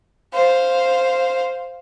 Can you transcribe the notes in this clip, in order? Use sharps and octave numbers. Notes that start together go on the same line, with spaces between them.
C5 F5